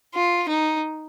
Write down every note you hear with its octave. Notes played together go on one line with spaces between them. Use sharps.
F4
D#4